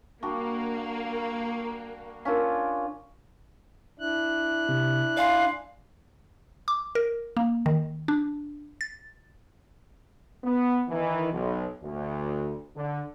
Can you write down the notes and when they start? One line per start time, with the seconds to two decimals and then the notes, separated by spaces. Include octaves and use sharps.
0.23 G3 A#3 D4 F#4
2.25 C#4 D4 F4 A#4 F5
3.99 D4 E4 F#6
4.69 C3
5.17 D5 F5 G#5 C6
6.68 D6
6.95 A#4
7.37 A#3
7.66 D#3
8.08 D4
8.81 A6
10.44 B3
10.89 D#3 E3
11.32 B1
11.83 D2
12.75 D3